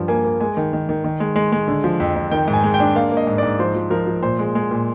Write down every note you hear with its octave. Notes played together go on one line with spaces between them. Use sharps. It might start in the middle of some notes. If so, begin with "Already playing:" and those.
Already playing: G2 F3
A#3 G#5
A#3
G#3 G#5
D#3
D#3
D#3
D#3
G#3
G#3
G#3
D3
F3
F2
F2
D#3 G5
G#2
G#5
G#3
G5
D4
A#3 F5
A#3
D#5
G#2
G#2 D5
F3 C5
F3
F3 A#4
F3
A#2 C5
G#3
G#3
A#2